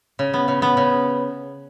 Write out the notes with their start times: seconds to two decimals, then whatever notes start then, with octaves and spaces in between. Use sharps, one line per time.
0.19 C#3
0.34 B3
0.48 C#3
0.62 B3
0.77 C#3